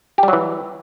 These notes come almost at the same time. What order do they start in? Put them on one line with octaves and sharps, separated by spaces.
G4 G3 F#3 E3